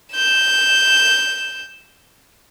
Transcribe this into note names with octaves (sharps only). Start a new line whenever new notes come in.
G6 E7